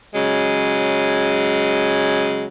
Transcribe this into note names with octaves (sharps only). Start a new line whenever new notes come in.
C#3 F#3 G#3